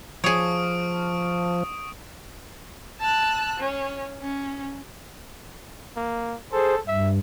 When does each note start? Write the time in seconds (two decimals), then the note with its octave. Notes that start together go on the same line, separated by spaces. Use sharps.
0.24 F3 G#4 C#5 C#6 D#6 D7
3.01 A5 E6 F#6
3.59 C#4
4.21 C#4
5.96 A#3
6.52 G#4 A4 C5
6.87 G2 E5